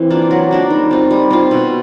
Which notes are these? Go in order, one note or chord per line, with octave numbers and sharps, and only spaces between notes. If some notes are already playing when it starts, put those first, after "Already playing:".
Already playing: E3 C4
A#3 D4 F4
F#3
A#3 D4 F4
D#3 G3
C4 F4
G3
C4 F4
B2